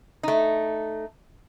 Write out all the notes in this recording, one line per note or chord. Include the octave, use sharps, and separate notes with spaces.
A3 D#4